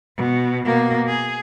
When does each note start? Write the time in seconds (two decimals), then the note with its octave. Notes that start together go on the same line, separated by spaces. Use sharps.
0.17 B2
0.66 B2 A#3
1.07 G#4